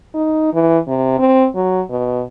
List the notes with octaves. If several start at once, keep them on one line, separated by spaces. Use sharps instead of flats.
D#4
E3
C3
C4
F#3
B2